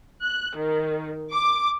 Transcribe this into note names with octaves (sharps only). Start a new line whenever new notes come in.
F#6
D#3
D6